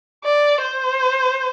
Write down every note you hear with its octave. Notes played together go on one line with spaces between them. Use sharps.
D5
C5